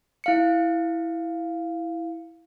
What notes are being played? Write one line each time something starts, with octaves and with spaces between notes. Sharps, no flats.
E4 F5 C#7